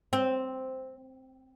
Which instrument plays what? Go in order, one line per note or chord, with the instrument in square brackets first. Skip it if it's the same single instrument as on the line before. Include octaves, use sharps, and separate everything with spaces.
[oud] C4